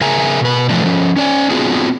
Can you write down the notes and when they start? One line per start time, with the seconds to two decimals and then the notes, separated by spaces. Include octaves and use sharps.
0.01 C#3 G#4 A#4 E5 G#5 A#5
0.41 B2 B4
0.69 A2 D3 F3 A3 A#3 D4
0.84 F3 C#4
1.16 C#4 D5 G#5
1.50 B3 C4 D4 F4 F#4 G#4